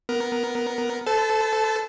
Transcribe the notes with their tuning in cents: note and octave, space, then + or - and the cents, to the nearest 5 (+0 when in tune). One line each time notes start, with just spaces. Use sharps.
B3 +0 A#4 +10
A4 +0 C5 -45 A5 -20